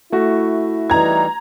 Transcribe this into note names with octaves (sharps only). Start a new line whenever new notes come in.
A3 E4 F#4
E3 G3 D#4 A#5 G#6